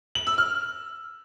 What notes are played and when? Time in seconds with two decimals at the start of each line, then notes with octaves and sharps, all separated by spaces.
0.15 F#7
0.27 E6
0.38 F6